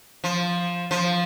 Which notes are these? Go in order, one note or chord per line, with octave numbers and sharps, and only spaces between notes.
F3
F3